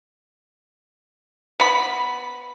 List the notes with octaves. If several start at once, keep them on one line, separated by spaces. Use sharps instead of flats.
B3 B5